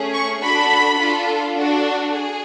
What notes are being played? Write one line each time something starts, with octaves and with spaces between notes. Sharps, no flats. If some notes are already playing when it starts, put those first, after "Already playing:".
Already playing: A3 C#4 G#4
C#6
D4 F#4 A4 B5
D4 F4 A4
D4 F#4 A4
G#4